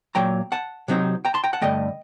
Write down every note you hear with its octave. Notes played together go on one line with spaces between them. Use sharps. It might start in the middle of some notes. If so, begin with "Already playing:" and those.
A#2 F#3 A#3 G5 A#5
F#5 A5
C3 F#3 C4 D#4
G5 A#5
A5 C6
G5 A#5
F#5 A5
G2 D3 A3 D#5 G5